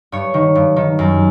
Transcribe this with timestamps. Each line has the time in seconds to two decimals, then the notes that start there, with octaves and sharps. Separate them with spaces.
0.12 G2 C#5
0.34 D#3
0.55 G2
0.76 D#3
0.99 F#2